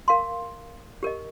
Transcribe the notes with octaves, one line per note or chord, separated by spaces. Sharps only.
A#4 F5 C6
G4 A#4 D#5